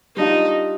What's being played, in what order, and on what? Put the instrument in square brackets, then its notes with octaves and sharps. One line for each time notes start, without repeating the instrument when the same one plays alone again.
[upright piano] G3 D4 F4 [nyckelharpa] D#4